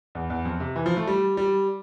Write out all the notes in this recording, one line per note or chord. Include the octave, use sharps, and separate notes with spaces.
E2
E2
F2
C3
E3
F3
A3
G3
G3